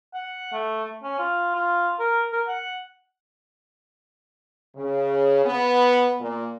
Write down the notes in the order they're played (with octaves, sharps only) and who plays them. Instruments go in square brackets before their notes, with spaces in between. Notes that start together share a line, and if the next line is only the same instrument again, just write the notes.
[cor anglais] F#5
A3
C#4
F4
F4
A#4
A#4
F#5
[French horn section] C#3
B3
A#2